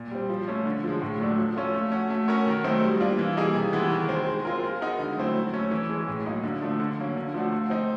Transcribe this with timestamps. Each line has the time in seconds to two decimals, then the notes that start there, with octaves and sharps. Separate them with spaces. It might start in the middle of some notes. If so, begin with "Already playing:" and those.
Already playing: A#2
0.11 G3 C4
0.30 F3
0.48 A3 C#4
0.66 D3
0.84 F3 G#3
1.02 A2
1.20 F#3 A3 D4
1.38 F3
1.56 A3 C#4 F4 A4
1.74 A3
1.92 C#4 F#4
2.10 A3
2.28 C#4 F#4 A#4 C#5
2.46 D#3
2.64 F#3 A3 C4 D#4
2.83 G3
3.00 A#3 D4 F4
3.19 E3
3.36 G3 A#3 D#4 G#4
3.55 C3
3.73 E3 G#3 B3
3.90 D#3
4.09 G#3 C4
4.26 G#3
4.45 C4 F4 A#4
4.63 G#3
4.81 B3 D#4 F#4 A#4
4.99 D3
5.17 F#3 A3 C4 E4
5.35 F#3
5.53 A3 C#4
5.71 E3
5.90 G#3 C#4
6.08 A2
6.25 F#3 A#3 D#4
6.43 D3
6.61 F3 A3 D4
6.80 D3
6.98 F#3 A#3 C#4
7.16 D3
7.34 F3 A3 D4 F#4
7.52 A3
7.70 C4 D#4